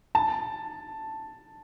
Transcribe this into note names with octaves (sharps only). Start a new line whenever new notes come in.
A5